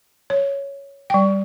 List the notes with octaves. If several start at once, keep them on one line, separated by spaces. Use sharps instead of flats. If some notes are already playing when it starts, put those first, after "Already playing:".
C#5
G3 G5